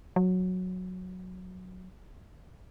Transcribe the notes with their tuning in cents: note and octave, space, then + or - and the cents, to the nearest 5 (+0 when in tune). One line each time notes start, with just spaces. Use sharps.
F#3 -10